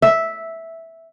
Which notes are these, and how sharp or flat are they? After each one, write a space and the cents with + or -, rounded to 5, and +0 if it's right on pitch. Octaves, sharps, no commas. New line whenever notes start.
E5 -5